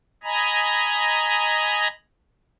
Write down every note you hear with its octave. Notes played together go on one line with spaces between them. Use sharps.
D#5 G#5 A#5 B5